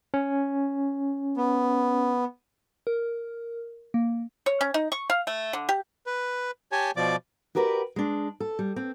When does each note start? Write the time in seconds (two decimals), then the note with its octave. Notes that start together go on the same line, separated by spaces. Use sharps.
0.14 C#4
1.37 B3
2.87 A#4
3.94 A#3
4.46 C#5
4.61 C#4
4.74 D#4
4.92 C#6
5.10 F5
5.27 A3
5.53 D3
5.69 G4
6.07 B4
6.72 G4 C#5 G#5 A5
6.96 B2 F3 D5 D6
7.55 F#4 G4 A#4 B4 D5
7.96 G#3 D4
8.40 A4
8.59 G3
8.76 C4